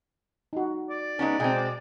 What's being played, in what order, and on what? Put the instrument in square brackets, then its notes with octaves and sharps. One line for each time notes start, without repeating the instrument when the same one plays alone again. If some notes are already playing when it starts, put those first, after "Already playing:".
[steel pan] D#4 F#4
[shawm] D5
[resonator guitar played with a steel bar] G#3 B3 C#4 [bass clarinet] D#4
[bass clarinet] B2 [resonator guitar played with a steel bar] G#3 C4 [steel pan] G5 G#5 A#5